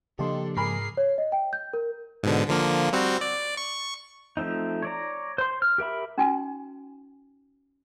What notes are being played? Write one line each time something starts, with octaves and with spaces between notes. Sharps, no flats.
C#3 F3 A#3 D4 G4 A4 D#5 C6
G#2 G#4 A#4 G#5 B5 D6 C7
C#5
D#5
G5
G6
A#4
G#2 B2 D3
D3 F3 A#3
G3 C4 F#4
D5
C#6
F3 A3 C4 D#4
C#5 D5 A#5
C5 C6
F6
G4 A#4 E5 B5
C#4 D#4 F#4 G5 G#5